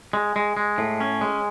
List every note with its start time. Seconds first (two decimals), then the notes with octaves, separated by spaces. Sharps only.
0.13 G#3
0.36 G#3
0.57 G#3
0.78 A2
1.01 C#4
1.21 G#3